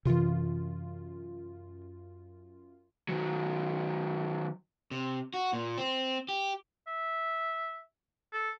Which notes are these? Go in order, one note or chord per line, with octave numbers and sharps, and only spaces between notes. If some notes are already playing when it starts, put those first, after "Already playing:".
F#2 C3 E3 F4
D#3 F#3
C3
F#4
A#2
C4
G4
E5
A4